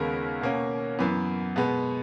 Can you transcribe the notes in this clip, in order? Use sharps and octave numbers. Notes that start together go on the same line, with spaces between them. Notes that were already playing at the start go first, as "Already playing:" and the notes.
Already playing: D#2 C#3 G#3 B3 A#4
B2 A#3 C#4
F#2 E3 B3
B2 G#3 B3